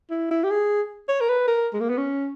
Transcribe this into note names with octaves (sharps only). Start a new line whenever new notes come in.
E4
E4
G4
G#4
C#5
A#4
B4
A#4
G#3
A#3
B3
C#4